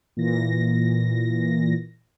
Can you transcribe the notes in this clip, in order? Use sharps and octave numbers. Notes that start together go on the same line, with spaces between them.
A#2 E3 A#6